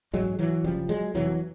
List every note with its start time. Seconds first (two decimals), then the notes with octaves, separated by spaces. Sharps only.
0.14 A1 G#2 F#3 G#3
0.39 E3 F#3
0.64 F#1 F#2 C#3 F3 G3
0.89 F#3 G#3
1.14 F1 F2 C3 E3 F#3